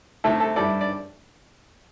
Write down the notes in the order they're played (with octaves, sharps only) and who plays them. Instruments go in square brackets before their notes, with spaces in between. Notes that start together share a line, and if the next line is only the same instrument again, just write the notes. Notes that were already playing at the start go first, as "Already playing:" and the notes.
[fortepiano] C3 A3 E4 A4
A4
G2 G3 E4 A4 D5
D5